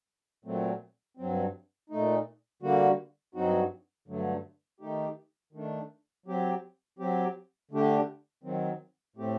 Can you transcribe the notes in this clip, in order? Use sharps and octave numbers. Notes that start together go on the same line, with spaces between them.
A#2 F#3 A3 C4
G2 F#3 C4
A#2 A3 D#4
D3 G3 A#3 F#4
G2 F#3 C4 D#4 F#4
G2 D3 F#3 A3
D#3 A3 D#4 G4
D#3 A3 D4
F#3 C4 G4
F#3 C4 G4
D3 A3 D4 G4
D#3 F#3 C4
A2 A3 C4 G4